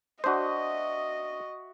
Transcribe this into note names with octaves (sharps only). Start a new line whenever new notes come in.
D4 F#4 C5 D#5 E5 D#6